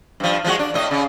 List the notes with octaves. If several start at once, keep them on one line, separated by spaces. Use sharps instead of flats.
G2 F3
F3 G#3 F#4
D4
A2 D#5
C#3